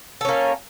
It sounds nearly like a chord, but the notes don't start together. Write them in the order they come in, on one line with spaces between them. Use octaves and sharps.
A4 C#4 A#3